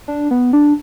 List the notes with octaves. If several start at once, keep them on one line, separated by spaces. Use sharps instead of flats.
D4
B3
D4